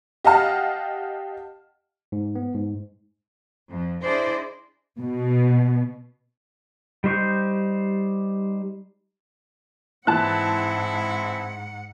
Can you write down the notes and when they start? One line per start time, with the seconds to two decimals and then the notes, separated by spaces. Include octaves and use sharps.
0.24 G4 D#5 F5 F#5 A5 F6
2.12 G#2
2.35 B3
2.54 G#2
3.70 F2
4.04 D4 E4 G#4 C5 D5 D#5
4.99 B2
7.04 G3 D#4 C5 C#6 G6
10.07 G#2 E3 G#3 C4 E4 F#5 A5 F#6